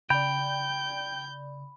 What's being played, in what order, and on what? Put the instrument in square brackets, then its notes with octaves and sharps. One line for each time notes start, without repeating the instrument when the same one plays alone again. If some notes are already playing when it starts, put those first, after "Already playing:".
[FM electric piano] C#3 D5 [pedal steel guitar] G5 [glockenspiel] B5 [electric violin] G6